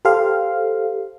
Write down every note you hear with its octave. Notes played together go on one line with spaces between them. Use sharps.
G4 A4 C5 F5